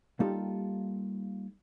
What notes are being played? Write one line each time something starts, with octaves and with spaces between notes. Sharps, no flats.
G3 A#3 D#4 F4 G4 A4